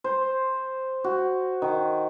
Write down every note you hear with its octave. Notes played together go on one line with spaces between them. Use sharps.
C5
F#4
D#3